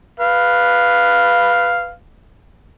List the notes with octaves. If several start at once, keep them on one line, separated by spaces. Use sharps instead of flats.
B4 F5